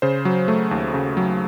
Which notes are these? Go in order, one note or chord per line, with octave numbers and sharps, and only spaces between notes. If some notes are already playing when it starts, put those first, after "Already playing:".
C#3 C5
F#3
A3
D#2
C#3
F#3